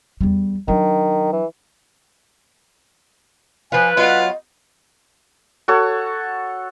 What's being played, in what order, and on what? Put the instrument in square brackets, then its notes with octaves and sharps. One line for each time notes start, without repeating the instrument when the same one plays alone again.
[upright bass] E2 G3
[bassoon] D#3 [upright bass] F#3 D4
[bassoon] E3
[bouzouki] F3 F4 [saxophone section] B4 [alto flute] G#5
[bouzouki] F#3 B3 [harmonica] F4 [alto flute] D#5
[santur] F#4 A4 C#5